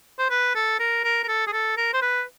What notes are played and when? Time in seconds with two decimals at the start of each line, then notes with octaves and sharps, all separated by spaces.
0.19 C5
0.30 B4
0.55 A4
0.79 A#4
1.04 A#4
1.23 A#4
1.28 A4
1.47 G#4
1.53 A4
1.77 A#4
1.93 C5
2.02 B4